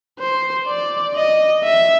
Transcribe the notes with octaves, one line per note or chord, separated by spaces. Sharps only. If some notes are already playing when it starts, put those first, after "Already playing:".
C5
D5
D#5
E5